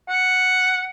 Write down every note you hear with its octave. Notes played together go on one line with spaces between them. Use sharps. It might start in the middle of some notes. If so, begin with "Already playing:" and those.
F#5